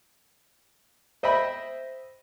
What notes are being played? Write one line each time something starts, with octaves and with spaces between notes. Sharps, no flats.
C5 D#5 E5 G5 B5